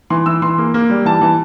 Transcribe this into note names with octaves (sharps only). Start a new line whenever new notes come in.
E3 C6
E3 E6
E3 C6
A#3
A#3
G3
E3 A5
E3